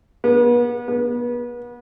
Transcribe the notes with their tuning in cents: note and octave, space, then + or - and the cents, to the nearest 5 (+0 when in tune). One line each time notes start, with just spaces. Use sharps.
B3 -40
B3 -35